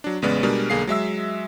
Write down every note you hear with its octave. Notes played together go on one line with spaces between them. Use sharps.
F#3 D4
A1 C#3 G#3 B3 D5
B2 G3 G#3 D4 A#4
B1 D3 A#3 G#4 F5 C7
F#3 G#3 E5 E6